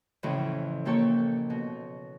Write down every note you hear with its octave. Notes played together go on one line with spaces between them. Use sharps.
F2 A2 C#3 E3
A#2 A#3 G4 A4 C#5
B2